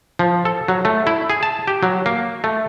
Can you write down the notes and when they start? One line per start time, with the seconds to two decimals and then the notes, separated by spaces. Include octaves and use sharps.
0.19 F3
0.45 A4
0.68 F#3
0.85 A3
1.07 E4
1.30 G#4
1.43 A5
1.67 G4
1.83 F#3
2.06 A#3
2.44 A3